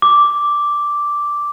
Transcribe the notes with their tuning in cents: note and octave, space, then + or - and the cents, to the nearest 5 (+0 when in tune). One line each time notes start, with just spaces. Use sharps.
D6 -5